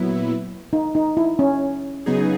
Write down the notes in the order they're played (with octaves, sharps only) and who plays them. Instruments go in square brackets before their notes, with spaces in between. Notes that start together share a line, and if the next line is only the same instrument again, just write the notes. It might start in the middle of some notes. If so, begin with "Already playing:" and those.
Already playing: [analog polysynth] A#2 F#3 B3 E4
[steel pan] D#4
D#4
E4
C#4
[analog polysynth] C#3 F#3 B3 D#4 G#4